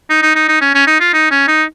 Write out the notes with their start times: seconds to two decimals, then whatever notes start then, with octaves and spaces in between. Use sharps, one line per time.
0.10 D#4
0.22 D#4
0.35 D#4
0.48 D#4
0.61 C#4
0.74 C#4
0.87 D#4
1.00 F4
1.13 D#4
1.31 C#4
1.48 D#4